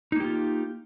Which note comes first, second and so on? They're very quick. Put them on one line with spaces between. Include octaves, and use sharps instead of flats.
D#4 A#3 G4 F4